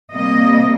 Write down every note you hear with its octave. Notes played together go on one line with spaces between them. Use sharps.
C3 G3 A#3 D#5